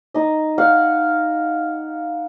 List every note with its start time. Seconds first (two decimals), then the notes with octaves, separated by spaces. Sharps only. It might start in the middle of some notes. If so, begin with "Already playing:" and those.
0.14 D#4 D#5
0.58 F5 F#5